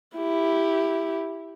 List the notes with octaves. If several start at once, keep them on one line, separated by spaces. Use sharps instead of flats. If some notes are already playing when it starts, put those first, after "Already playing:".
E4 G4